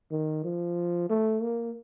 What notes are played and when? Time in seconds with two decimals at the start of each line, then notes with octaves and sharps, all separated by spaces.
0.11 D#3
0.44 F3
1.10 A3
1.42 A#3